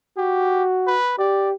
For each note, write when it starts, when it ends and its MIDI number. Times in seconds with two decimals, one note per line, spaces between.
0.17 0.96 66
0.17 0.64 67
0.87 1.15 71
1.18 1.53 67
1.18 1.50 74